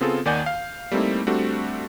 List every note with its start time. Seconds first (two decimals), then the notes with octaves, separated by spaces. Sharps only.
0.01 C#3 B3 C4 F4 G#4 A4
0.25 D#2 D#3 D5 F#5 G#5 G6
0.46 F5
0.92 G3 A3 A#3 C4 D#4 E4
1.27 G3 A3 C4 D4 F#4